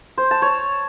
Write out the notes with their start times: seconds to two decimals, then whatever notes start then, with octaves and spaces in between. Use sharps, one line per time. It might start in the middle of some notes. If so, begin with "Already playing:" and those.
0.18 C5
0.31 A5
0.42 C#5